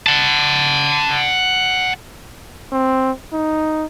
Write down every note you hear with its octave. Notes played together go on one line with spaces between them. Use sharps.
F#5 A5
C4
D#4